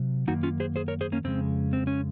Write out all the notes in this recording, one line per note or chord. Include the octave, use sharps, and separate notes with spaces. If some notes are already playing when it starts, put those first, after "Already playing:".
Already playing: C3 F#3
F#2 D#3 A#3 D#4 F#4
C#4 F4
G#4 C5
G#4 C5
A#4 C#5
G#4 C5
A#3 C#4
F2 C#3 G#3 C4
C4
C#4